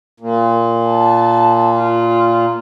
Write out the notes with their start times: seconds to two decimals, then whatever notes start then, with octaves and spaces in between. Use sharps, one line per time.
0.20 A#2
0.87 A5
1.78 F4